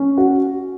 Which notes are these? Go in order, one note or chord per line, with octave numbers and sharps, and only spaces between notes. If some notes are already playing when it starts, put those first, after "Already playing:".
Already playing: C#4
F#4